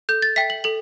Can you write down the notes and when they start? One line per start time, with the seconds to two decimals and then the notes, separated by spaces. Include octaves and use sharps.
0.09 A4 G6
0.22 A6
0.36 E5 G5 B6
0.50 F#7
0.64 A4 F#7